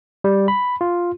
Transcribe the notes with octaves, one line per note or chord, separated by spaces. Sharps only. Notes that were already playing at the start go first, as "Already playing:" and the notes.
G3
B5
F4